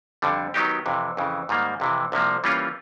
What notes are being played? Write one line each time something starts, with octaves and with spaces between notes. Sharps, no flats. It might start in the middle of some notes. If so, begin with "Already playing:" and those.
F2 D3 G3
D#3 F#3 B3 D#4 G4
F2 C3 E3
F2 C#3 E3
G#2 D#3 G3 A#3
F2 C3 E3
C2 C3 F3 A#3
E3 G3 A#3 C#4 F4